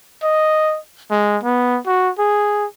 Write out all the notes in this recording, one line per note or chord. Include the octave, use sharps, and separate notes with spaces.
D#5
G#3
B3
F#4
G#4